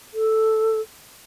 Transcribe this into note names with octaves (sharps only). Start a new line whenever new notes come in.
A4